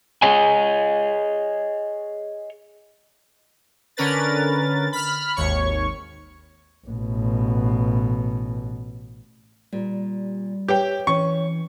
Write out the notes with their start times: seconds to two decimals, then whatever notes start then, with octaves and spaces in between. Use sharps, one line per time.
0.22 G#4 C#5 D#5 G#5
3.97 D3 C#4 A#4 B4 A6
4.93 B5 F6
5.36 G#1 D#2 C#5 C#6
6.87 A1 B2
9.73 A#2 G3
10.68 G4 B4 C#5 E5 G5
11.07 E3 C#4 C#6